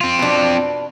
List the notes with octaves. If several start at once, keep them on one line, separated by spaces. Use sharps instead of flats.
C4 F4
B2 D4